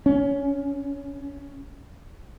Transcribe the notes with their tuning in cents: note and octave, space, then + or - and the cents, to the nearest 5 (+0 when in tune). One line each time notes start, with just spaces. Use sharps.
C#4 +15